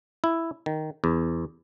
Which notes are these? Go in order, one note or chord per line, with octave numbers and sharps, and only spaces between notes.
E4
D#3
E2